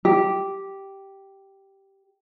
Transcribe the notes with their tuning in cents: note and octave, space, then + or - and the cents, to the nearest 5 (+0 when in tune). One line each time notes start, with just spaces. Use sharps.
G4 -5